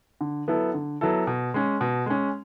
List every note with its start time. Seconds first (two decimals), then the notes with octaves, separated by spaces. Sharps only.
0.21 D3
0.48 F#3 B3 E4 A4
0.74 D3
1.01 F#3 B3 E4 A4
1.27 B2
1.54 G#3 C#4
1.81 B2
2.06 G#3 C#4